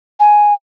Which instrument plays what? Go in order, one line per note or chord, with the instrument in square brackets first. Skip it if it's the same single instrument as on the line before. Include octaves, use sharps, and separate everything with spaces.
[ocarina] G#5